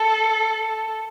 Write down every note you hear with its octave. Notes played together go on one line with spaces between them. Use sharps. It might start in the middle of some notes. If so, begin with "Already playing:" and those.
Already playing: A4